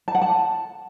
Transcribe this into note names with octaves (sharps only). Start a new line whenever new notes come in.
A5
F#5
A5